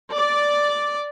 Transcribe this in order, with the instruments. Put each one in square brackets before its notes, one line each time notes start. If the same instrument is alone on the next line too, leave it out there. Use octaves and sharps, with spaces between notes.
[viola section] D5